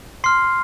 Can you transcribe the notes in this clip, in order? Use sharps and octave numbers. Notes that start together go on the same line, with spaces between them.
C6 F6 C7